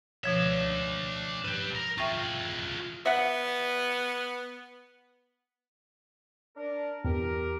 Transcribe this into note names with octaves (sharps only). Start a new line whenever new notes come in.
B2 F3 D4 C#5 E5
G4 B4
A#4
F4 G#4 E5 G5 C#6
B3 E5 F#5
D4 A#4
E2 G4 A#4